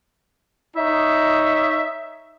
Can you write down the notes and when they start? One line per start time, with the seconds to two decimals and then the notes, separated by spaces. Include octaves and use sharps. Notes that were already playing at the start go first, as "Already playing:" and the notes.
0.76 D#4 C#5 D#5 E5